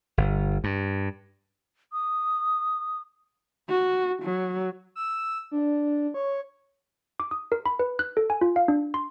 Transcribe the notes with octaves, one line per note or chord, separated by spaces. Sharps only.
G1
G2
D#6
F#4
F#3
E6
D4
C#5
D6
D#6
A#4
B5
B4
F#6
A4
G#5
F4
F5
D4
C6